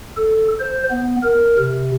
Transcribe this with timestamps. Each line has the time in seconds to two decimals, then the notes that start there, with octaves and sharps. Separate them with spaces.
0.17 A4
0.60 C5
0.91 B3
1.23 A#4
1.58 C3